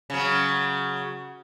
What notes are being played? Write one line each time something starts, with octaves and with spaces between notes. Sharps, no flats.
C#3 F#3